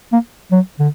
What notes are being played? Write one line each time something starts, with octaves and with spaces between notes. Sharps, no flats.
A#3
F#3
D3